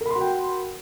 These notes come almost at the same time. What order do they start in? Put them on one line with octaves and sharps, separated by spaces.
A#4 B5 C6 F#4 G5